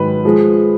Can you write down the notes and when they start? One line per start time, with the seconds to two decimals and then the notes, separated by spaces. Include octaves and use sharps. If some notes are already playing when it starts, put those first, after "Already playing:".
Already playing: G#2 D#3 F#3 B4
0.25 F3 G#3